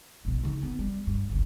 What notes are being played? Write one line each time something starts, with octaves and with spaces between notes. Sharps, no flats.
A#1 B2
C#3 D#4
B3
G3
G2
G1 C#2